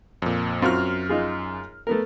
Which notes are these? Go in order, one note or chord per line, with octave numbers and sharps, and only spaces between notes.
F2 A#2
F#2 C4 F4 F#4 F6
D#4 F4 G#4
A3 B3 A#4